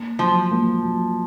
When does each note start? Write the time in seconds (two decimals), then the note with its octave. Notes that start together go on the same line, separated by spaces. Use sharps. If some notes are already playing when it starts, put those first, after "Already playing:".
Already playing: A#3
0.19 F3 F#3
0.51 A#3
0.83 F#3